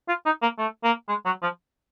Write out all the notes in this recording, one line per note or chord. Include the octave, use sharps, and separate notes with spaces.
F4
D#4
A#3
A3
A#3
G#3
F#3
F3